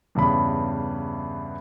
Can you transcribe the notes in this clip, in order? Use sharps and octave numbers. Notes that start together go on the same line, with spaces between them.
E2 G2 C#3 B5